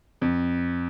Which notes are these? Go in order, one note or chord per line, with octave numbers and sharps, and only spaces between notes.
F2